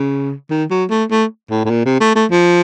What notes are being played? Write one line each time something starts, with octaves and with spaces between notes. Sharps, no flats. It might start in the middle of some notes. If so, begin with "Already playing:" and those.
Already playing: C#3
D#3
F#3
A3
A3
A2
A2
A#2
C3
A3
A3
F3